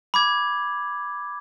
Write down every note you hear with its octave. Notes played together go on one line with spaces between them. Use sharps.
B5 D6 G#6